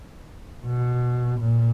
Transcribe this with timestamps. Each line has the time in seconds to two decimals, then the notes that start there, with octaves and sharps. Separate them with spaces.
0.66 B2
1.40 A#2